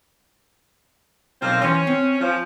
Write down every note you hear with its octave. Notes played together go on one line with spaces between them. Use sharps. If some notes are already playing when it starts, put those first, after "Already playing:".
B1 F3 A#3 C4
E3 C#4 C6
C4
F3